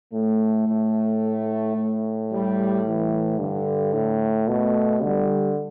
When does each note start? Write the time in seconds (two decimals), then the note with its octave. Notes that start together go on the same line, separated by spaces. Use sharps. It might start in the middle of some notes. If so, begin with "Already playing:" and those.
0.13 A2 A3
0.68 A2
1.76 A2
2.31 G3
2.86 E3
3.39 G2 D3
3.93 A2
4.48 B2 A3
5.03 D3 G3